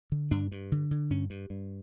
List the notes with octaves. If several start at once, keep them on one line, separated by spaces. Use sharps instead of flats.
D3
G2 D4
G2
D3
D3
G2 C#4
G2
G2